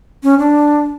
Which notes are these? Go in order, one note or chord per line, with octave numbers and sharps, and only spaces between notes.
C#4
D4